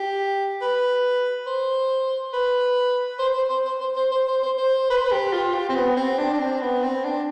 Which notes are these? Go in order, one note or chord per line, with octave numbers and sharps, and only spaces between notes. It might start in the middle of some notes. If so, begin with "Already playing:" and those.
Already playing: G4
B4
C5
B4
C5
C5
C5
C5
C5
C5
C5
C5
C5
C5
B4
C5
B4
G4
F4
G4
C4
B3
C4
D4
D4
C4
B3
C4
D4